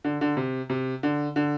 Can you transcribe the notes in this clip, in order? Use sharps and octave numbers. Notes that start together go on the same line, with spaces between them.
D3
D3
C3
C3
D3
D3